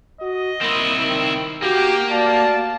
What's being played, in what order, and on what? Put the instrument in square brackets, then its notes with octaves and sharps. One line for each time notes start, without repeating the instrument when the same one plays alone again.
[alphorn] F#4 [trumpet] D#5
[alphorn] A#3 [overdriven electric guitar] C4 E4
[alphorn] D#3
[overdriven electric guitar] A#3 [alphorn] F#4 [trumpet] G4
[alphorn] F#4 [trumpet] D5 [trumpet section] F5 A5